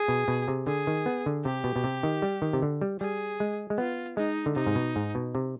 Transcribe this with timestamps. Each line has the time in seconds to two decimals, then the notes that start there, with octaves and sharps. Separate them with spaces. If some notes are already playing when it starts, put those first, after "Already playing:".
Already playing: G#4
0.08 B2
0.28 B2
0.48 C3
0.67 D3 G#4
0.87 D#3
1.06 B3
1.26 D3
1.45 C3 G4
1.64 B2
1.76 B2
1.84 C3
2.03 D#3
2.22 G3
2.42 D#3
2.53 C3
2.62 D3
2.81 G3
3.00 G3 G#4
3.40 G#3
3.70 G#3
3.78 B3 F4
4.17 G#3 D#4
4.46 D3
4.56 C3 D#4
4.66 G#2
4.75 B2
4.96 G#2
5.15 B2
5.35 C3